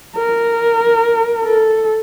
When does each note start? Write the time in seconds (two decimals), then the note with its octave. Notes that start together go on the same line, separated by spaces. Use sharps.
0.16 A#4
1.43 A4